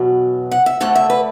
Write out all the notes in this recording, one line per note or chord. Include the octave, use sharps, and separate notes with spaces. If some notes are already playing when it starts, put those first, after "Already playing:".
Already playing: E2 B2 F#3
F#5
E5
D2 D3 A3 F#5
E5
B4